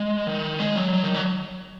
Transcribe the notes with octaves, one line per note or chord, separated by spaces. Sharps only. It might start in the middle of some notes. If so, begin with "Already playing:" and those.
Already playing: G#3
D#3
G#3
F#3
F#3
D#3
F#3